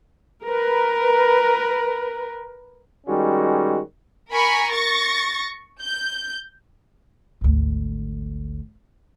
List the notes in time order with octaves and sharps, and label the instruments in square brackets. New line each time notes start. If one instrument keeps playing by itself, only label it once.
[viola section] A#4 B4
[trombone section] D#3 G3 G#3 C#4 F#4
[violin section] A#4 G#5 B5 C#6
C#6 A6 A#6
G6
[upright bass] G#1 D2